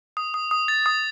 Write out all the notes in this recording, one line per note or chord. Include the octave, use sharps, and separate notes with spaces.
D#6
D#6
D#6
A6
D#6